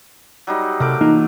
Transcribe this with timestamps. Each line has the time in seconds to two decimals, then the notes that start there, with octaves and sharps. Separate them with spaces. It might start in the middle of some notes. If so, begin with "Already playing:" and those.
0.47 F#3 G3 D#4
0.80 C3 A3 A#4 D6
1.01 E3 A#3 D#4 F4